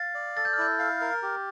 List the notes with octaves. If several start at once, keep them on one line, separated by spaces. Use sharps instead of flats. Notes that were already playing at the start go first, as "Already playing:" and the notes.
Already playing: F5 A6
D5
A4 A6
G6
F6
E4 G6
F5 F6
A#4
G4